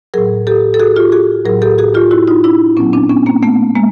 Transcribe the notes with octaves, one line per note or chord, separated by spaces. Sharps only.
A2 F#3 G#4 A#4
G4 A4
A4
F#4 G#4
F4 G4
F#4 G#4
A2 F#3 G#4 A#4
G4 A4
F#4 G#4
F4 G4
E4 F#4
D#4 F4
D4 E4
A#2 F#3 B3 C#4
C4 D4
B3 C#4
A#3 C4
A3 B3
G#3 A#3